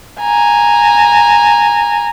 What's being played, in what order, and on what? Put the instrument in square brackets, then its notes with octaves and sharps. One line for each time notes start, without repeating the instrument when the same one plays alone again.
[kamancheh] G#5 A#5